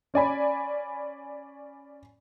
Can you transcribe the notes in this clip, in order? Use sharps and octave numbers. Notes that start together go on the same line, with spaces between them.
C#4 D5 G#5 B5